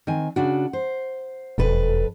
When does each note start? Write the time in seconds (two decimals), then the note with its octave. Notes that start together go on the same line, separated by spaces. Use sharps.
0.07 D#3 C4 G#5
0.36 C#3 D4 F#4
0.73 C5
1.58 E1 F2 A4 B4